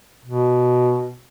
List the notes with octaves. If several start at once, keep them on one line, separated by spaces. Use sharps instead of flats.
B2